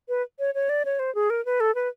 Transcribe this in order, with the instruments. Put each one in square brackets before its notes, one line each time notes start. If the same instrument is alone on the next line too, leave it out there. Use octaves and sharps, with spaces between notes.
[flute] B4
C#5
C#5
D5
C#5
C5
G#4
A#4
B4
A4
B4